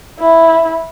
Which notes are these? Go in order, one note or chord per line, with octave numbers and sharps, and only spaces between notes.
E4